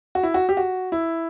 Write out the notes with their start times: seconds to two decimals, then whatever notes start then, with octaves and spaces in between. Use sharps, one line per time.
0.15 F#4
0.23 E4
0.34 F#4
0.49 G4
0.57 F#4
0.92 E4